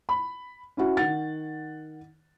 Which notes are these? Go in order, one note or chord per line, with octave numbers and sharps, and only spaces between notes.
B5
C#4 E4 F#4
D#3 F#5 A6